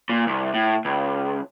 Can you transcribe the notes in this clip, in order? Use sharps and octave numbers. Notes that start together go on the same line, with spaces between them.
A#2
C2
A2
C#2